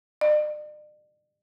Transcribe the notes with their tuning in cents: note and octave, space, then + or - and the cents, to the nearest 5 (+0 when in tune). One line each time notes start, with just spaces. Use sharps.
D5 +45